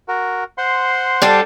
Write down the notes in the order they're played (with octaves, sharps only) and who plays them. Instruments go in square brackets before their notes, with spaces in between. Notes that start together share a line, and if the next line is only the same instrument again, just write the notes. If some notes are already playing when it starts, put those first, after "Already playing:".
[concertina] F#4 A#4
C5 F#5 C6
[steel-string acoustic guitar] G3 D4 A4